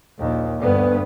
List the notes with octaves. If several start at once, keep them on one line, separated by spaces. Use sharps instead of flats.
A#1 D#2
D2 G2 B3